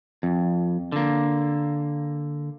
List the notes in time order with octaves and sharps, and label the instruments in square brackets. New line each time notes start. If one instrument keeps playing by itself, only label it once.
[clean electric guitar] F2
D3 A#3